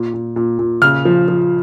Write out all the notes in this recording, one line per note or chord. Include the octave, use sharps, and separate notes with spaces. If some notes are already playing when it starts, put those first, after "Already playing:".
Already playing: A#2
A#2
A#2
A#2
C#3 F6
F3
F3